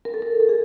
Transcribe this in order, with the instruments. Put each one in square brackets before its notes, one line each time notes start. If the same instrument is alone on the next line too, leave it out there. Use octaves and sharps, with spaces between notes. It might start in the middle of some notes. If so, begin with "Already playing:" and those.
[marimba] A#4
A4
A#4
A4
G#4